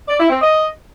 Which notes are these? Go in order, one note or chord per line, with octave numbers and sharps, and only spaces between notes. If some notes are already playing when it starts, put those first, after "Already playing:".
D5
E4
C4
D#5